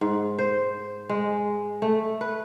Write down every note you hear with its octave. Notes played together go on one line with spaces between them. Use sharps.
G#2
C5
G#3
A3
B4